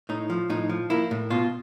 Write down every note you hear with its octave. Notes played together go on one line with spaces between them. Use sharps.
A2 D#4
F3
A2 D#4
F3
A#3 E4
A2
B2 F4